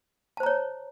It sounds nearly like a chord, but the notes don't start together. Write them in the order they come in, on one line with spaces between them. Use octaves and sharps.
A5 C5 A#5 C#5